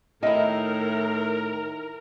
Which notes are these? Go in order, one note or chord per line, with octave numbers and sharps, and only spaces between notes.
A2 D#3 E4 A#4 D#5